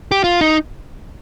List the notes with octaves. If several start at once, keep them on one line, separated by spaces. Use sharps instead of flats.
G4
F4
D#4